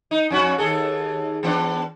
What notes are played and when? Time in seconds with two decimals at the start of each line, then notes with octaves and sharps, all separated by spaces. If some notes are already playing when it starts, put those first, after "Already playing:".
0.11 D#4
0.30 F2 C#4 F#4
0.58 D#2 G#4 A4
1.43 E3 B3 D4